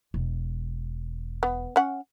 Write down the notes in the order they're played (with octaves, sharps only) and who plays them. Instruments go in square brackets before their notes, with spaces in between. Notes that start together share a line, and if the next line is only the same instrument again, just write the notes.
[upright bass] E1
[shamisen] B3
C#4 F#5